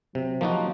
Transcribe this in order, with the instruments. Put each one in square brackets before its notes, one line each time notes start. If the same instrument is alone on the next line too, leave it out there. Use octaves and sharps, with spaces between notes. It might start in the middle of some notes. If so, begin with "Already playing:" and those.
[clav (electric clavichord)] C3 [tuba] F#3
[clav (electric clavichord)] F3 A#3 D#4 F#4